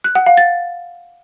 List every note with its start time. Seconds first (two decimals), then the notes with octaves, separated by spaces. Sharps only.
0.04 F#6
0.15 F#5
0.26 F5
0.37 A6